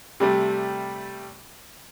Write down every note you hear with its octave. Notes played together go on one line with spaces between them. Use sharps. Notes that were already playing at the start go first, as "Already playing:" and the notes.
C3 G3 A3